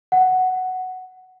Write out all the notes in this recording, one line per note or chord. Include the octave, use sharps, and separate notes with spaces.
F#5